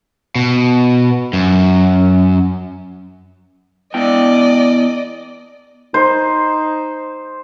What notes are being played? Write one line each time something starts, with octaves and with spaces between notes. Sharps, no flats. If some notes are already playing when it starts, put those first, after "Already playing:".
B2
F#2
B3 E4 D5 D#5 G5
D#4 C5